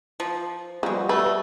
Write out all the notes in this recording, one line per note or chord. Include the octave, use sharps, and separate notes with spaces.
F3
B2 F3 G3 G#3 F#4
A3 B4